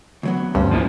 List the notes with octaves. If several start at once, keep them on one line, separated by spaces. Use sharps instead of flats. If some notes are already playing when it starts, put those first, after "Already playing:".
D2 F#3 B3
D2 G2 C#4 C5
F3 A#3 E4